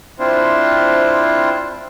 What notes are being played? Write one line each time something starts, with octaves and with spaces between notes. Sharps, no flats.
C4 D4 E4 F4 C5